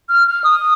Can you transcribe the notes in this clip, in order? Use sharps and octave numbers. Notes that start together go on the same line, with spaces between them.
F6
F6
D#6